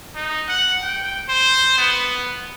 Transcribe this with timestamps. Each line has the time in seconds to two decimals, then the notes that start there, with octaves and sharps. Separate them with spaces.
0.15 D#4
0.49 F#5
0.83 G5
1.29 C5
1.78 B3